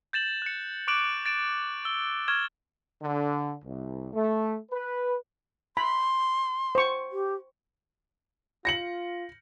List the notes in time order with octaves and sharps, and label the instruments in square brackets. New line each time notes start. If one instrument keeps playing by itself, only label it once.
[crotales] G6 A6 E7 F#7
F#6 C#7
C#6 D6 F#6 D7 E7 F#7
A6 D7 E7
E6 G7
C#6 F6 G#6 E7 G7
[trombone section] D3
C2
A3
B4
[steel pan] B5 [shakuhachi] C6
[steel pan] C5 C#6
[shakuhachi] G4
[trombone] F4 [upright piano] A#6 C#7 F#7